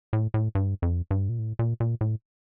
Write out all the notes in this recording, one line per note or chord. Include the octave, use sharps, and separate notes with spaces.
A2
A2
G2
F2
G2
A#2
A2
A#2
A#2
A2